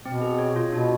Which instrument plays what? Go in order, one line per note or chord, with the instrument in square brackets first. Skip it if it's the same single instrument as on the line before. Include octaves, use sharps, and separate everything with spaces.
[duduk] B2 [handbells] C4
[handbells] G#4
C#5
F4
[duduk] B2 [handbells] D4